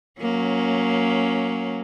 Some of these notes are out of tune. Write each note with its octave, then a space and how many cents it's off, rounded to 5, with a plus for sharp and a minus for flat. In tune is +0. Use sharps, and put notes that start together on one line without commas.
F#3 -15 A#3 +0 C#4 +0